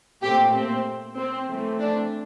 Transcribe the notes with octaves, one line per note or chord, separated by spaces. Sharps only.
A#2 A3 C4 G4
C4
C4
E3 A3 C4
D4